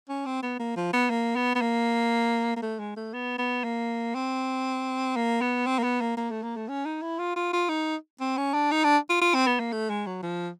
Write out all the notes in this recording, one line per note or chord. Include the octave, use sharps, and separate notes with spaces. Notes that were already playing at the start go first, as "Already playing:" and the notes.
C#4
C4
B3
A#3
F3
B3
A#3
B3
B3
A#3
A#3
A3
G#3
A3
B3
B3
A#3
C4
A#3
B3
C4
A#3
B3
A#3
A#3
A3
A#3
A3
C#4
D#4
E4
F4
F4
F4
D#4
C4
C#4
D4
D#4
D4
F4
F4
C4
B3
A#3
A3
G#3
F#3
F3